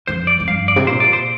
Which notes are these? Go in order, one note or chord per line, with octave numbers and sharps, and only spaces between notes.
F2 C5
D5
F2
G2 F5
D5
C3
A#2 C5
D5
C5